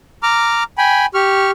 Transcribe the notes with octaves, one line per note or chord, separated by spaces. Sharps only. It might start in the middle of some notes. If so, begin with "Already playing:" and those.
A#5 D6 F6
G5 G#5 B5
G4 C#6 F6